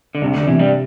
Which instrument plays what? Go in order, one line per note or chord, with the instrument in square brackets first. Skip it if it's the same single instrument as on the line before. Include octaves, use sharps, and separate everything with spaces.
[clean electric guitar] D3
[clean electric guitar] C2 C3 [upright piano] D4
[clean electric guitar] D2 D3
[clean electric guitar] E2 E3 [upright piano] C3
[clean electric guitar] G2 G3